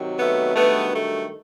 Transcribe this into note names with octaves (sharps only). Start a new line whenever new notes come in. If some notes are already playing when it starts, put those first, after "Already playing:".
Already playing: C3 D#3 F#3
A3 B3
G2 D#3 F#3 A3 B3
A3